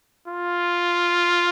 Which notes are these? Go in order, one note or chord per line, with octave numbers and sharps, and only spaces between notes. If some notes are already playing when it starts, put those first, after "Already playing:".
F4